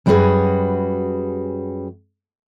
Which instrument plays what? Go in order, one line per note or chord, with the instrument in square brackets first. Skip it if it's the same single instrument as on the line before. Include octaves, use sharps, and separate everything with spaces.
[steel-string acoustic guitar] F#2 G3 D4 F#4 G#4 B4